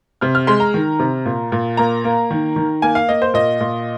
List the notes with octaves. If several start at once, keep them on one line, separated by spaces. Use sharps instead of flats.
C3 F6
F6
G#3 C6
A#5
D#3
C3
A#2
A#2
A#3 A#5
A#3
D#3
D#3
A#3 G#5
F5
A#3 D#5
C5
A#2 D#5
A#2